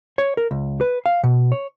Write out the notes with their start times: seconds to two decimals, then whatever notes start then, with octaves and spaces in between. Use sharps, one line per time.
0.18 C#5
0.37 A#4
0.51 C#2
0.81 B4
1.06 F5
1.24 B2
1.52 C#5